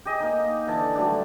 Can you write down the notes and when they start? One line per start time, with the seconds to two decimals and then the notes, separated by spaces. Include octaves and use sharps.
0.05 G4 G#4 D#5
0.20 A#3 D#4
0.67 D3 E3 A4 A5
0.95 F#3 G3 A3 D4